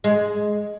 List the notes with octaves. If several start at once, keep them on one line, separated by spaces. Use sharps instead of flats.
G#3